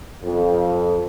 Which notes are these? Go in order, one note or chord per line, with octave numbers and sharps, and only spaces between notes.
F2